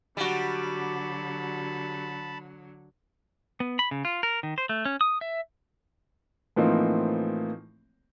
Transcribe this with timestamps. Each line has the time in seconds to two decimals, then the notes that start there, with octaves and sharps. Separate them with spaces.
0.17 D3 F#3 G3 F#4 A5 B5
3.60 B3
3.79 B5
3.91 C#3
4.05 F4
4.23 A#4
4.43 D#3
4.58 C5
4.69 A3
4.85 C#4
5.01 D#6
5.21 E5
6.56 A2 E3 F3 A#3 C4 D#4